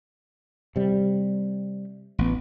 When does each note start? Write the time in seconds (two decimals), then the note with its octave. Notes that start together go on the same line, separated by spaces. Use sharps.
0.76 C3 G3
2.19 A1 B3